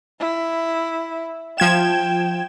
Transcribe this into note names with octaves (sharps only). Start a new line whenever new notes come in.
E4
F3 G5 G#6 E7